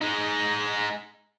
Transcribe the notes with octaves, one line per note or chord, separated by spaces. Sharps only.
G#3 D#4